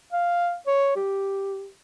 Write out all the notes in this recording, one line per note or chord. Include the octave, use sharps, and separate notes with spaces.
F5
C#5
G4